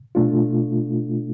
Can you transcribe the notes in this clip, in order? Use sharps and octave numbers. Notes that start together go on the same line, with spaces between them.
B2 A3 D4 F4